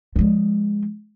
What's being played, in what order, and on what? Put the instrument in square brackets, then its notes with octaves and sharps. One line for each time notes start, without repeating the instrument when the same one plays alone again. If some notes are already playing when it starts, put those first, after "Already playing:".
[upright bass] F3 G#3